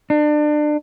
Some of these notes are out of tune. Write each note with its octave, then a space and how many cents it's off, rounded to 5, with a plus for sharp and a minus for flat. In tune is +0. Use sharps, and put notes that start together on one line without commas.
D4 +30